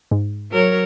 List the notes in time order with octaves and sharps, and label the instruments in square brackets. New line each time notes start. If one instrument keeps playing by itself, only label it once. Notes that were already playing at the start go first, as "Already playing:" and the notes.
[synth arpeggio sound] G#2
[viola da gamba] F#3 A#4 C#5